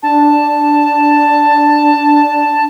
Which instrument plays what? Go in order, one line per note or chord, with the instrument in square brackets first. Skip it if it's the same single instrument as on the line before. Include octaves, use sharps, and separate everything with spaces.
[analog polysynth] D4 [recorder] A5